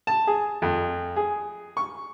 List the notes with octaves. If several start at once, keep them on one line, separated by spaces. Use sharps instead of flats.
A5
G#4
F2
G#4
C#6